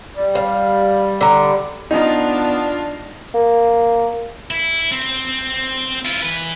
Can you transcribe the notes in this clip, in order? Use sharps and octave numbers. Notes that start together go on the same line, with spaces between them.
G3
F5
D3 A#5
B3 D4 D#4 F4
A#3
E4
C4
E4 F4
E3 B4